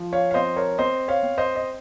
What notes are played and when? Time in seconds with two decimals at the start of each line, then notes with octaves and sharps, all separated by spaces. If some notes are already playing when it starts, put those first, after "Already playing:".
Already playing: F3
0.13 C#5 F5
0.31 F5
0.34 C4 C5 D#5
0.56 A#4 C#5
0.78 C4 C5 D#5
1.08 C#5 F5
1.23 C4
1.38 C5 D#5
1.56 D#5